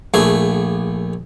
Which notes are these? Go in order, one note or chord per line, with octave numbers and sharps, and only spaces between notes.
A#1 A3 G#4